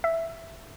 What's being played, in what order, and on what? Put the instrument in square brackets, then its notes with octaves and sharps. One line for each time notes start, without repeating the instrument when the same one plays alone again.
[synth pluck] E5